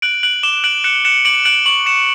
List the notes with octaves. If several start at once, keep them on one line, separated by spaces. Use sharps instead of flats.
F#6 D7 F#7
F#6 D7 F#7
D6 E7 G7
F#6 D7 F#7
F#6 C#7 E7
F#6 C#7 E7
D6 D7 F#7
F#6 D7 F#7
C#6 D7 F#7
C#6 C#7 E7